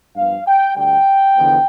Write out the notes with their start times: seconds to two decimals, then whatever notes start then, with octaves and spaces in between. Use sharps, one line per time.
0.16 G2 F3 B3 F5
0.46 G5
0.75 D2 D3 G3 G5
1.36 E2 D3 F3 B3